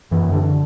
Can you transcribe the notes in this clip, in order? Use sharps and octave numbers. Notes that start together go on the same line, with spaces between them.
F#2 E3
D3
D3